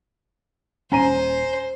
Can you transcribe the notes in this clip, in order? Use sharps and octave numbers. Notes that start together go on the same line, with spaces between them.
D#1 C#4 C5 G#5 A#5 D#7